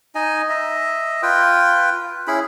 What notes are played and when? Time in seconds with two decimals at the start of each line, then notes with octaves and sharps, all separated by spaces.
0.15 D#4 D#5 G#5
0.49 D#5 E5
1.22 F4 B4 G5
2.28 C#4 E4 G#4 B5